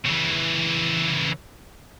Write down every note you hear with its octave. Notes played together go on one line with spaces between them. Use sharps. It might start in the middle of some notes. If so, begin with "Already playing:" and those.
C#3 E3